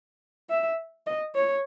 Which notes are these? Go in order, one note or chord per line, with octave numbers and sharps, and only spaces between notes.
E5
D#5
C#5